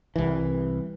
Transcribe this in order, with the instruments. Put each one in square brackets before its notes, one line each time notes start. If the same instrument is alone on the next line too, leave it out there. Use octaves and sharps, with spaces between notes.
[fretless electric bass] C2 E3